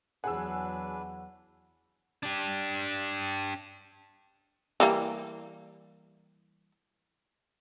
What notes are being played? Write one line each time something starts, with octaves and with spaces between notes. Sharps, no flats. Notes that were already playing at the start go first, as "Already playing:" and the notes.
E2 F#3 D4 G#4 B4 F#5 E6
D4 G4
E3 G3 A#3